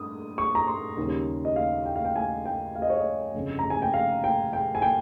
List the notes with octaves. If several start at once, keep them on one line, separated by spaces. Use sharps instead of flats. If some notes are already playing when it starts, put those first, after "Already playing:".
Already playing: G2 D#6
C#6
A#5
C6
D#2 C#3 G3 C#4
D#5
F5
G5
F5
G5
G#5
G5
F5
D#5
C#5
D#5
G1 F2 C#3
A#5
G#5
G5
F5
G5
G5
G#5
G5